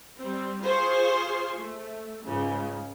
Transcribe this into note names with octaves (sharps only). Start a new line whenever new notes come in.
G3 C4
F4 G#4 C5 C6 C#6
A3
C#2 G#2 C#3